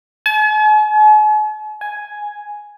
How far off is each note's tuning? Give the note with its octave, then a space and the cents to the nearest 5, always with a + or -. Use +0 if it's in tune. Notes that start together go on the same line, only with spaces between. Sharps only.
G#5 +45
G#5 +0